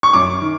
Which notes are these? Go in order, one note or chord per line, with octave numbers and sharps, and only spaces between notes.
C#6
F#2 D6
D#3